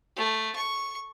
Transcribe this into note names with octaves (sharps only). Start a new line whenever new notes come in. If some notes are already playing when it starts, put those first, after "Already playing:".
A3
C#6